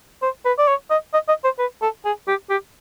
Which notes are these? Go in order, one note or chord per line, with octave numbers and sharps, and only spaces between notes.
C5
B4
D5
C#5
D#5
D#5
D#5
C5
B4
A4
G#4
G4
G4